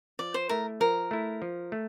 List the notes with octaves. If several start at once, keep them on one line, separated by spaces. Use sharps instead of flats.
F3 D5
C5
A3 E4 A#4
F3 A#4
A3 E4
F3
A3